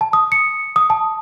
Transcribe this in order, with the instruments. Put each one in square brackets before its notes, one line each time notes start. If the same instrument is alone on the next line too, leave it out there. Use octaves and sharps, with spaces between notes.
[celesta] A5
D#6
C#7
D#6
A5